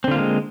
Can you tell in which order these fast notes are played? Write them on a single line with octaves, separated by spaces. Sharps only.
C4 D3 F4 A#3 G#3